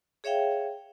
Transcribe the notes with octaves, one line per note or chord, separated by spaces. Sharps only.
G#4 C#5 E5 F5 G5